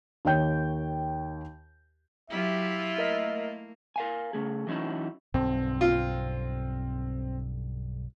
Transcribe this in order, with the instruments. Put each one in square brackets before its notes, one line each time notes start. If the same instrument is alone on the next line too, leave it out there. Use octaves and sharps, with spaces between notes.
[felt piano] D#2 D#3 C#5 G5 G6
[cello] F#3 G4 [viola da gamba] E4 F4 [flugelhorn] E5
[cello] A3 A#3 [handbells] A#4 D#5
[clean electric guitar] A#4 F5 G#5
C#3 A3 G#4
E3 F#3 C#4 D#4 E4
[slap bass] B1 G2 D3 [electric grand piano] C4
[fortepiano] F4